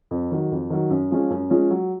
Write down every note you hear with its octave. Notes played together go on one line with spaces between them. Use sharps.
F2
D#3 F#3
F2
D#3 F#3
F#2
F3 G#3 C#4 F4
F#2
F3 G#3 C#4 F4
F#3